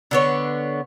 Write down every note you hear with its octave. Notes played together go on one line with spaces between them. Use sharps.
D3 B3 C#5